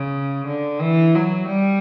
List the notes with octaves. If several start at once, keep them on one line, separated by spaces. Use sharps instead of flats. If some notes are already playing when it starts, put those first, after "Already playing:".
Already playing: C#3
D3
E3
F#3
G3